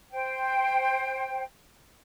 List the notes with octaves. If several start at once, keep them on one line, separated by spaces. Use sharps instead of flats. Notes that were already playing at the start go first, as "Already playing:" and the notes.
C5 G5